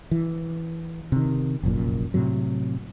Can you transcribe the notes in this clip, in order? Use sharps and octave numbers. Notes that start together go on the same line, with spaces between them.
E3
C3 D#3
F1 A#1 F#2 A#2
A2 C3 F#3